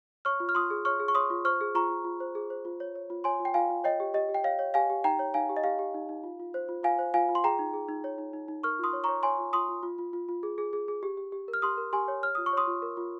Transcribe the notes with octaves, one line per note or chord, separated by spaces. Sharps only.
C#5 C#6 F6
F4
F6
F4 C6 D#6
G#4
C#5 C#6 F6
G#4
C#6
C#5 C6 D#6
F4
C5 C#6 F6
G#4
F4 A#5 C#6
F4
F4
C5
G#4
C5
F4
C#5
C#5
F4
C#5 G#5 C6
F4
G5
F4 F5 G#5
F4
C#5 D#5 G5
G4
G4 D#5
G4
G5
C#5 F5
C#5
G4 F5 G#5
G4
D#4 G5 A#5
C#5
D#4 F5 G#5
G4
D#5
G4 F5
G4
D#4
D#4
F4
F4
C5
F4
F4 F5 G#5
C5
F4 F5 G#5
F4
C6
G#4 G5 A#5
D#4
G#4
D#4
C#5
D#4
D#4
D#4
A#4 C#6 F6
F4 C6 D#6
C#5
C#5 A#5 C#6
C#5 G#5 C6
F4
F4 C6 D#6
F4
F4
F4
F4
F4
G#4
G#4
G#4
G#4
G4
G4
G4
A#4
F6
G4 C6 D#6
A#4
G4 G#5 C6
C#5
C#5 F6
F4 D#6
C#6
C#5 C6 D#6
F4
A#4
F4